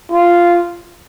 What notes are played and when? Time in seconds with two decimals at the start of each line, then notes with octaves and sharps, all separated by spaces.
0.11 F4